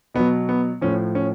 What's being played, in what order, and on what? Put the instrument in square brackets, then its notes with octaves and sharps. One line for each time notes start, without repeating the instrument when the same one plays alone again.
[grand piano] B2 F#3 B3
B3
A2 F3 C#4
C#4